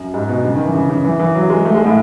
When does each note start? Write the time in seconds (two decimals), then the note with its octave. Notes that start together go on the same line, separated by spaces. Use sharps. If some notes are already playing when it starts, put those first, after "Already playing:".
Already playing: F#2
0.14 G#2
0.28 B2
0.44 C#3
0.54 D#3
0.64 E3
0.75 C#3
0.89 C#3
1.04 E3
1.19 E3
1.35 F#3
1.50 G#3
1.65 A3
1.75 G#3
1.85 A2